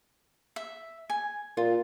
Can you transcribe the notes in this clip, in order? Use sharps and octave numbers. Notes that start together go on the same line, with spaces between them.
E5
G#5
A#2 F4